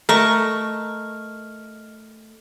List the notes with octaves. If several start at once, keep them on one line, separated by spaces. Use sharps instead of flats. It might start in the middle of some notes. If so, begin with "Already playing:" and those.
A3 A#4 D#5 C#6 F6